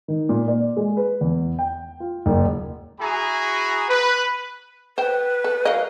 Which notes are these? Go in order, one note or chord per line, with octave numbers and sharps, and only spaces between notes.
D#3
A#2
D5
G#3
B4
E2
G5
F4
F#1
E4 F#4 G#4 G#5 A#5 B5
B4
B4 C5 G5
A4
F#3 A#4 D#5 F5